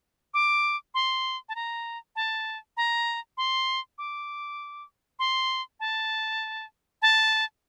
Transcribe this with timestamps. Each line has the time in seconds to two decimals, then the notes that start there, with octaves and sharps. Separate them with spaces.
0.34 D6
0.94 C6
1.49 A5
1.55 A#5
2.16 A5
2.77 A#5
3.37 C6
3.98 D6
5.19 C6
5.80 A5
7.02 A5